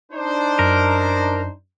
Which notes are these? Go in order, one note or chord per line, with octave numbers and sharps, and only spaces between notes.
D4 D#4 C5
F#2 A#4